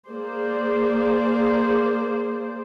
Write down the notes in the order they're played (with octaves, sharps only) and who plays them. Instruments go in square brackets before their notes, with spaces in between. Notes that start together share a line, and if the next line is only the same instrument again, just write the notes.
[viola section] A#3 G#4 C5 D5